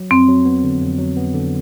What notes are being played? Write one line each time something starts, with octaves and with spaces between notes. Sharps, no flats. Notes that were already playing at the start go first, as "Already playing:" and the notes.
Already playing: F#3
F2 C4
F#3
B3
D3
F2
F#3
B3
D3